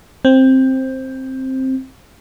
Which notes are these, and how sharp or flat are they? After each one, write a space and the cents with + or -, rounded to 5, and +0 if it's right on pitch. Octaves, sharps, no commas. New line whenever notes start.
C4 +10